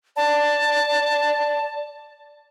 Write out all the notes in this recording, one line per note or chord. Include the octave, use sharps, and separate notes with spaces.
D5 A5